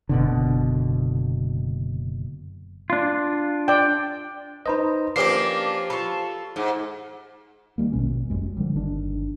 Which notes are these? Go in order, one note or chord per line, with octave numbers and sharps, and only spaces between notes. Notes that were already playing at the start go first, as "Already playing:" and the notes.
F#1 B2 D3
D4 F4
D5 G5
D#4 B4 C5 D#5 A#5 B5
F3 A#3 C#4 D4 G4 A#4 B4 C7
F4 A4 B5 C#6
G#2
D#3 E3 G3 A#3
A#1 D#2 B2 C#4
F#1 C2 F#2 G#3
D3 F3 G3
G1 D#3 D4